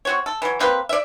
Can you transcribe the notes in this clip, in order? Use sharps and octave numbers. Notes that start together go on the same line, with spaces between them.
C4 F#4 C#5
A4
E3 F#3
A#3 C4 G4 B4
D5 E5